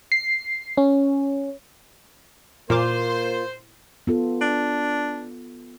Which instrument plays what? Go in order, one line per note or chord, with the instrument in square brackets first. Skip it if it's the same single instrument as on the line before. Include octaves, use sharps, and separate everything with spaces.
[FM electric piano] C7
C#4
[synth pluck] A#2 A#4 D6 [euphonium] A#3 [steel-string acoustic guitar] F4 [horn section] C5
[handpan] B3 F4 A4
[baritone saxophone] D4